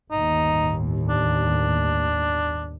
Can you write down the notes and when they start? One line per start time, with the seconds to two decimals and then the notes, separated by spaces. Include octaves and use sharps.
0.11 G1 D#2 A2 D#4
1.09 D4